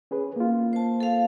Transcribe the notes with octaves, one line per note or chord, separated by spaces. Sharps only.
C#4 G#4 B4
A#3 F4
C5 A5
A4 F5